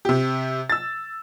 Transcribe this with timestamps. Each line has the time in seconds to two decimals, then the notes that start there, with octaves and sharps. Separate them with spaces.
0.05 C3 G4
0.70 E6 A6